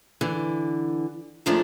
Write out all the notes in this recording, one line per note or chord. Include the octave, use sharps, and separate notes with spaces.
D3 E3
D#2 D#3 F3 G#3 A3 D4